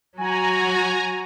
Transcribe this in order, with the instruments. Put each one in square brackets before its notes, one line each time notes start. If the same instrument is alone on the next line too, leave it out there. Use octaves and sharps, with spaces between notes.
[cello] F#3 F#4 [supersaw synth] G#5 A#5